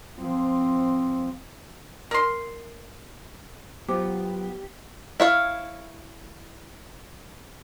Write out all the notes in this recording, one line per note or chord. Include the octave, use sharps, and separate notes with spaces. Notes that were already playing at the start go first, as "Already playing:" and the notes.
F3 C4
A#4 C6
F#3 B3 F4 G4 C5 D6
E4 C#5 F5